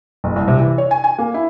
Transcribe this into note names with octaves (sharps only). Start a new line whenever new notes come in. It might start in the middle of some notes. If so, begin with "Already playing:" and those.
F#1
C2
C3
E3
C#5
G#5
G#5
A#3
E4